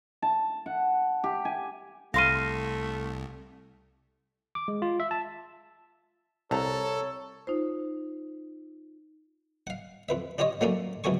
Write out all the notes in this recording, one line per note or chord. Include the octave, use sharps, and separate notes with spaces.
A5
F#5
G4
G#5
C2 A3 F5 C6 F6 A#6 D#7
D6
G#3
F4
E5
A5
C2 A4 C#5 A5 A#5
D#4 F4 C5
F5 F#5
F2 B4 E5
D4 F4 G4 C#5 D#5
F#3 A3 A#3 C#4 D4 A4
C#2 C3 F#3 A3 G#5 C#6